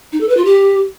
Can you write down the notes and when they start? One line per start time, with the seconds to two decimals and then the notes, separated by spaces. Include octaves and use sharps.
0.12 D#4
0.21 A4
0.29 B4
0.37 F4
0.45 G4